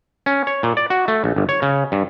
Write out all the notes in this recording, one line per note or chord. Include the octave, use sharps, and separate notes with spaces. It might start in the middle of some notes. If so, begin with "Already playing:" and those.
C#4
C#5
A#2
D5
F#4
A3
A#1
G1
C#5
C#3
G2